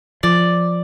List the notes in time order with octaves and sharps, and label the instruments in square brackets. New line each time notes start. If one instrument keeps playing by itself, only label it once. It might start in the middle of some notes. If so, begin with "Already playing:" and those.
[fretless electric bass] F3 [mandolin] D5